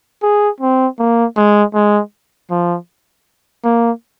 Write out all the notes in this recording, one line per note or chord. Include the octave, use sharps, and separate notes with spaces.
G#4
C4
A#3
G#3
G#3
F3
A#3